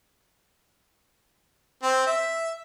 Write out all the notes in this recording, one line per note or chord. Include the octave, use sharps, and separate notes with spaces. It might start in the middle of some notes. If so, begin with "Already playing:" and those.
C4
E5